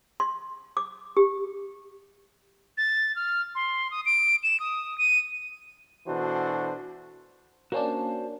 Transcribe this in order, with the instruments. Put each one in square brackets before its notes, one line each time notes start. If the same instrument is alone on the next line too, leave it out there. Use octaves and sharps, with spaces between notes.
[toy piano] C6
D6
G4
[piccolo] A6
F6
C6
D#6
D7
E7
D#6
D#7
[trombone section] B2 E3 D4 F#4 A4 C5
[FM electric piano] A#3 C#4 D4 [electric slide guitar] F#4 C5 A5